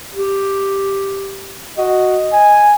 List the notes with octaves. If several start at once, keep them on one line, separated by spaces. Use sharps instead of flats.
G4
F#4 D#5
G#5